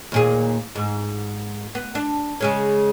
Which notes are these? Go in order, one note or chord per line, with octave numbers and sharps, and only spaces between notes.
D#2 A#2 G#4
G#2
B3
D4
C#3 G#3 C#4